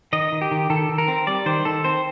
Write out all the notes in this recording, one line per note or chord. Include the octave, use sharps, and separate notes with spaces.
D#3 D#5
D#3
G4
D#3
D#3 A4
D#3
A#4
C4
G3 D5
D#3 C5
D#3 A4
C4 C5